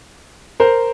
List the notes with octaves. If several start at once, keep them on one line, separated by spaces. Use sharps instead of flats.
A#4 C5